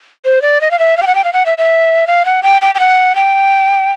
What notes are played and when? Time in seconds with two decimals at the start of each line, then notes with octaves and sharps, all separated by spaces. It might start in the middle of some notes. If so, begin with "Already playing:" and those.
0.25 C5
0.42 D5
0.61 D#5
0.71 F5
0.79 E5
0.97 F5
1.02 G5
1.07 F#5
1.15 G5
1.24 F5
1.33 F#5
1.46 E5
1.58 E5
2.07 F5
2.25 F#5
2.43 G5
2.62 G5
2.75 G5
2.79 F#5
3.15 G5